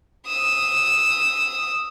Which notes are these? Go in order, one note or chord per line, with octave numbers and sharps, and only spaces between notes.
D#6 E6